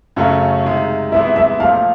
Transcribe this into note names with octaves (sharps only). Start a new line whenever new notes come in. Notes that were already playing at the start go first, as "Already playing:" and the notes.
F#2 C#3 F#3 A3 C#4 F5
C3 D#3 G#3
C3 E3 G#3 B3 E4 E5
E5
A#2 F3 A3 F5